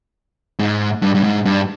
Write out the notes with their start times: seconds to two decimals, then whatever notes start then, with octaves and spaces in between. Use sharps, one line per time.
0.59 G#2
1.02 G2
1.15 G2
1.24 G#2
1.45 G2